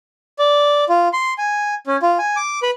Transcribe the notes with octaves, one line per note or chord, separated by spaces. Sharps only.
D5
F4
C6
G#5
C#4
F4
G#5
D6
B4